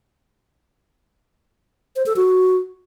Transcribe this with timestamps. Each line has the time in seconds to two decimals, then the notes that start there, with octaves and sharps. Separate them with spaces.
1.96 C5
2.06 A4
2.16 F#4